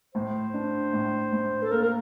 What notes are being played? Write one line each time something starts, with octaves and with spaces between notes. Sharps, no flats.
A2 C5
D4
A2
A2
A4
A#3 A#4
A#4